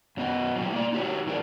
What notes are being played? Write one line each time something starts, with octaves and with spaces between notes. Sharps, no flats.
F#2 F#3 B3 D#5
A#2 F#3 G3 E4 G4
A#3 D5
D#4 F#4 G4 C#5
E2 E4 G#4 A#4 D5